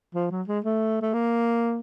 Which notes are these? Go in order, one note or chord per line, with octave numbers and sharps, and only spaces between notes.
F3
F#3
G#3
A3
A3
A#3